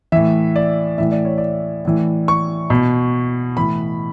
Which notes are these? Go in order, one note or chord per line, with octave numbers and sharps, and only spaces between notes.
A2 E3 E5
D5
A2 E3 E5
D5
C#5
D5
A2 E3
C#6
B2
A2 E3 B5